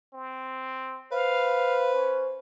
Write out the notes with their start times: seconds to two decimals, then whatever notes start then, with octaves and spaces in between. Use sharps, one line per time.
0.13 C4
1.12 B4 C5 F5
1.93 C#4